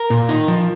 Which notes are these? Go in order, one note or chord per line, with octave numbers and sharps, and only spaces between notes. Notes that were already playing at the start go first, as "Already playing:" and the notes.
Already playing: A#4
A#2
D#4
F3